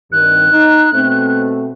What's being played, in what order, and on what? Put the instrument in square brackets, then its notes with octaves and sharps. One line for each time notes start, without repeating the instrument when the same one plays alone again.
[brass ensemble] C2 G2 D#3 [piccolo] F#6
[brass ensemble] D#4
B2 A3 C4